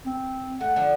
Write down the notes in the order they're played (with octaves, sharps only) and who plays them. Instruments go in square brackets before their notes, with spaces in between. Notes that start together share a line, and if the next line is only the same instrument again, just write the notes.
[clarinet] C4
[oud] A3 [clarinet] F#5
[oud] D3 F3